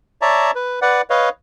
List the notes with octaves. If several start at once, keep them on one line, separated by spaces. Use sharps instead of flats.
C#5 D5 E5 A5 A#5
B4
B4 D5 F#5
B4 C#5 D#5 F5